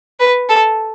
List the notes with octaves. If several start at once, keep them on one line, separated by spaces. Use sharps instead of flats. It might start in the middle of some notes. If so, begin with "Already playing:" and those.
B4
A4